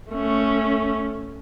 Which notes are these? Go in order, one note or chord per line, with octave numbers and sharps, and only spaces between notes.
A3 C#4